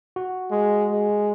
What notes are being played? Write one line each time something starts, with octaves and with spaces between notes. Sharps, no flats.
F#4
G#3
G#3